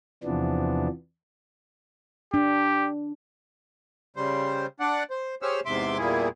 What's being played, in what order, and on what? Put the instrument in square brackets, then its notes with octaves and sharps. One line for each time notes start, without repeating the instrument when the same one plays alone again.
[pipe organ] E2 C3 E3 F3 B3 D4
[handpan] D4 [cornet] G4
[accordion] C#3 G3 C5
D4 D5 F#5
C5
G4 G#4 C5 C#5 E6 F6
E2 G#2 C3 E5 C6 D6
E2 A#2 G3 A#3 E4 G#4